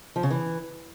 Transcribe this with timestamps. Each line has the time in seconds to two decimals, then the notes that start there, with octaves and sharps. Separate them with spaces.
0.16 F3
0.23 C#3
0.31 E3